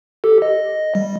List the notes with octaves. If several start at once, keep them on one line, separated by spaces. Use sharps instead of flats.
G4 A4
D#5
G3